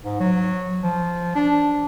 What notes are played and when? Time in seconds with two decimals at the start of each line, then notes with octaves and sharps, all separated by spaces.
0.05 G#2
0.20 F#3
0.83 F3
1.36 D4